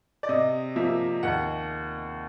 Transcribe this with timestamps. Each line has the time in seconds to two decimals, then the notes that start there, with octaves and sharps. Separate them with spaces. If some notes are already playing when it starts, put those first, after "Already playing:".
0.23 D5
0.29 C3 D#5
0.76 F3 A#3 E5
1.23 D#2 F#5